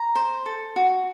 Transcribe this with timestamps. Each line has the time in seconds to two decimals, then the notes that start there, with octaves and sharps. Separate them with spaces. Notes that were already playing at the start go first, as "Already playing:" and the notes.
Already playing: A#5
0.15 C5
0.46 A4
0.76 F#4